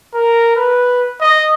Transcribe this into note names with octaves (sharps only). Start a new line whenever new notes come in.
A#4
B4
D#5